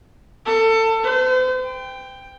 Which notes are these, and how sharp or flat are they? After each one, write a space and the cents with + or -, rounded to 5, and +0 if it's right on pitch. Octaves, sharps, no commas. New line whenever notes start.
A4 +25
C5 -40
G5 +10